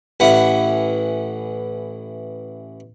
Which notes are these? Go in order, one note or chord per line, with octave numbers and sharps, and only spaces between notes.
A1 E3 F#5